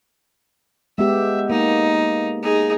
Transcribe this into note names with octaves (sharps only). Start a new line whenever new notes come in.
G#3 B3 G4 E5
A#3 D#4
D#4 G#4